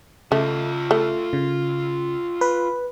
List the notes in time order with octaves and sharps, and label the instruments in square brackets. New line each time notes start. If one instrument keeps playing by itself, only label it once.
[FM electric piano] C#3 [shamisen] A3 [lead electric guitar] F4 D#5
[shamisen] A3
[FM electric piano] C#3
B4